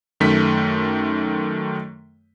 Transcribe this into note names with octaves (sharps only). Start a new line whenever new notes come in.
F#2 D#3 A3 B6